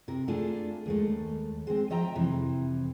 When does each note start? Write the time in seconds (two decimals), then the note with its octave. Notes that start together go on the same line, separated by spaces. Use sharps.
0.08 C3 A#4
0.28 A3 D4 F4 G#4
0.86 D#2 G#3 A3
1.67 G#3 C4
1.90 F3 D#5 E5 G5 A#5
2.15 F2 C3 E3